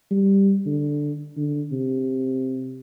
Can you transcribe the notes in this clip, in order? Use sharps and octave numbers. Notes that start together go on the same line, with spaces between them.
G3
D3
D3
C3